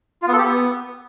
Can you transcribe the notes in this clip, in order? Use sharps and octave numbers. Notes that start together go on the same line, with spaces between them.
F4
B3
A4
G4
B3